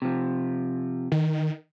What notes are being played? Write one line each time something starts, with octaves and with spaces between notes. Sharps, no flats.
C3 F3
D#3